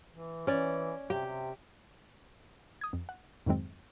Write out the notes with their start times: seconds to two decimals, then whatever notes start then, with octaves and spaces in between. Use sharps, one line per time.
0.11 E3
0.47 E3 C#4 D5
1.10 C3 G4
1.25 C3
2.81 D#6 G#6
2.93 F2
3.09 F#5
3.46 F2 G#2 D#3 F#3 G#3 C4